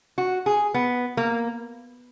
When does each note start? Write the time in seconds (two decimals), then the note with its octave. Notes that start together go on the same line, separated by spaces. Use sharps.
0.18 F#4
0.46 G#4
0.74 B3
1.17 A#3